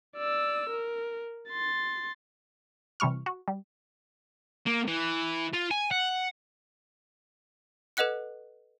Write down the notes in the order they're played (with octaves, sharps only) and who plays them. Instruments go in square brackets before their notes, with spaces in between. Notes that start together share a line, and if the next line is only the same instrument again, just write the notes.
[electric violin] D5 E6
A#4
C6 A6
[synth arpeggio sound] C3 E3 G3 C#6 F6
F#4
G3
[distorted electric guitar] A#3
E3
F4
G#5
F#5
[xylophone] A4 B4 D#5 F#5 F#6 C#7